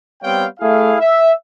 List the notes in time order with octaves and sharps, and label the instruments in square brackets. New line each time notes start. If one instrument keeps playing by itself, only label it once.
[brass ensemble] G3 B3 C4 C#5 F5 G5
A3 E4 G#4 F5
E5